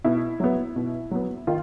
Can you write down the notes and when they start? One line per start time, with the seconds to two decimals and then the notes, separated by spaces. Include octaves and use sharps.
0.04 B2 E4
0.40 F#3 B3
0.76 B2
1.11 F#3 B3
1.47 D#3 F4